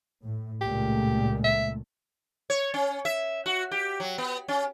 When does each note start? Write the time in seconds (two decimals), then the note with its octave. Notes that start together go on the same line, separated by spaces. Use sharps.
0.23 A2
0.61 C#2 A#2 A3 G4
1.44 E5
2.50 C#5
2.74 C#4
3.05 E5
3.46 F#4
3.71 G4
4.00 F#3
4.18 B3
4.48 C#4